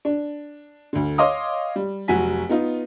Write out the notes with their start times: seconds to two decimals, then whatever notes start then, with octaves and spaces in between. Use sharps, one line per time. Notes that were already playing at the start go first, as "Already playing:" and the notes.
0.05 D4
0.93 D2 D3
1.18 C#5 D#5 F5 C6 D6 D#6
1.76 G3
2.08 F1 F#3 F#4 G#5 B6
2.49 B3 D#4 F4